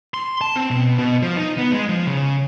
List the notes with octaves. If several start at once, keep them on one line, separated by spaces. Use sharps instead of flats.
C6
A5
C4
B2
B2
F3
D#4
B3
G#3
F3
C#3